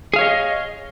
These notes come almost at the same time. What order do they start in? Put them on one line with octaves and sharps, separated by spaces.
G#4 F5 C#5 D#5